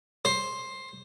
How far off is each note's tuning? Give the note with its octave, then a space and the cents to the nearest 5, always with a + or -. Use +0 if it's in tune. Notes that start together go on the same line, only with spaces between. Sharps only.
C5 +10